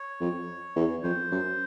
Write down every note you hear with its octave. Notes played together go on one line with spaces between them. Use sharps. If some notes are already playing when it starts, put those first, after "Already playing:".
Already playing: C#5
F2
E2
F2 C5
F#2